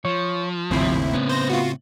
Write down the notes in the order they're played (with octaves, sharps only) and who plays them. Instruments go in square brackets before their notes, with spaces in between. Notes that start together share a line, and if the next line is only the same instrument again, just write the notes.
[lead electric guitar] F3 [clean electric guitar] C#5
[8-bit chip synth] G#1 D#2 E4 [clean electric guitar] A2 C#3 C4
[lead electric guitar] B3 C#4
[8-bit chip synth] C5 A#6
F4 F#4